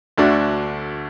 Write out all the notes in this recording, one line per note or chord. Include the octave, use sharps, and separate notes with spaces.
D2 D3 A3 D4 F#4